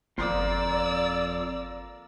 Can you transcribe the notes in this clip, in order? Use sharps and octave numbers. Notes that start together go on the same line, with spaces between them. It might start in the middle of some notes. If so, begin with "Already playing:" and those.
G1 F2 A#3 A#4 C5 D5 E6